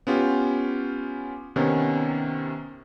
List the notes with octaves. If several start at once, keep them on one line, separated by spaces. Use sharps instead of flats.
B3 C#4 F4 G4
C3 D#3 B3 C#4